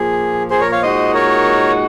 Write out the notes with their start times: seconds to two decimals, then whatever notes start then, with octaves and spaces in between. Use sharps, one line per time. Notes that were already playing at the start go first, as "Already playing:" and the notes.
Already playing: A#2 F3 A#3 G#4
0.50 G#4 C5
0.60 A#4 C#5
0.71 C#5 F5
0.82 A#2 G#3 D#4 F#4 C5 D#5
1.14 A#4 C#5